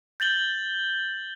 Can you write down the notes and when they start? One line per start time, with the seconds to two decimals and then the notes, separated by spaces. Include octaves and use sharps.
0.20 G6 A6 F#7 G7